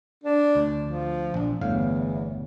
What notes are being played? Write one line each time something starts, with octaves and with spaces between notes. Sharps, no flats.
D4
D2
F3
A#1 D4
G1 E2 A2 F5